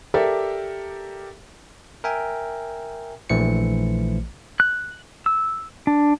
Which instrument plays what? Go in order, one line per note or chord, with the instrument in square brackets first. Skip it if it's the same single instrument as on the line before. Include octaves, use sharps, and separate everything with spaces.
[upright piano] G4 A4 A#4 D5 E5
[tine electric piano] A#4 E5 G5 G#5
A#1 E3 A3 C5 C#7
[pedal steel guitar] F#6
E6
D4